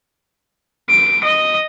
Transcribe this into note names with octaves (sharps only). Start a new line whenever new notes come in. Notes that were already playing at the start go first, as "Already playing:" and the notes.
D7
D#5